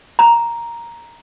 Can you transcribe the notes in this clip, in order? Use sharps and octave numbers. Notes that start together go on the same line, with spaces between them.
A#5